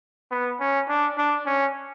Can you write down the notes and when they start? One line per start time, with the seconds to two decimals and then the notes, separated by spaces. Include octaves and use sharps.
0.31 B3
0.60 C#4
0.88 D4
1.17 D4
1.46 C#4